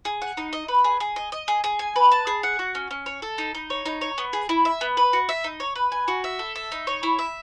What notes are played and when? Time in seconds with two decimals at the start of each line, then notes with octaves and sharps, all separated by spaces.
0.05 G#4
0.22 F#5
0.37 D#4
0.53 D#5
0.68 B4
0.84 G#4
1.00 G#4
1.16 D#5
1.32 D#5
1.48 G#4
1.64 G#4
1.79 G#5
1.96 B4
2.12 A5
2.27 G#4
2.43 F#5
2.59 F#4
2.75 C#4
2.91 C#4
3.06 C#5
3.22 A4
3.38 D#4
3.55 D#4
3.70 C#5
3.85 D#4
4.01 C#5
4.18 B3
4.33 G#4
4.49 E4
4.65 E5
4.81 B3
4.97 B4
5.13 F#4
5.29 E5
5.44 D#4
5.60 C#5
5.76 B4
5.92 G#5
6.08 F#4
6.24 E5
6.39 A4
6.56 E5
6.72 D#4
6.87 C#5
7.03 E4
7.19 E5